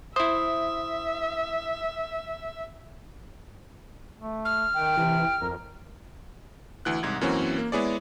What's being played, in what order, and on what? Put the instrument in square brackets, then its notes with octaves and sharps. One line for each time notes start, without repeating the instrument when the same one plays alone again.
[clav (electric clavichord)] E4 C5 [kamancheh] E5 [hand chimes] D#6
[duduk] A3
[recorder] F6
[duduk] D#3 [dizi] G5
[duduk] C3 [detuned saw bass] E3
[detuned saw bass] F2 [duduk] A#4
[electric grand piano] D2 E3 F#6
C2 G#2 G#6
F#2 E3 A#3 C4 C#4 F#4
A#3
G#3 B3 E4 G#4 C#5 D5